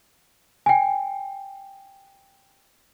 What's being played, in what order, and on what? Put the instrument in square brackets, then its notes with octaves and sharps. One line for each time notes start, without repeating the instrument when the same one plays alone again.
[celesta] G5 G#5